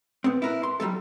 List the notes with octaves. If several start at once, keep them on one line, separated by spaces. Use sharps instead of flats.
B3 C4
E4 A#4 B4
C6
F#3 G3 A3 A4